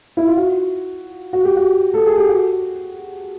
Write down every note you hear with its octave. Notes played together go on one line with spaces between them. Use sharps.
E4
F4
F#4
F#4
G4
F#4
A4
G#4
G4
F#4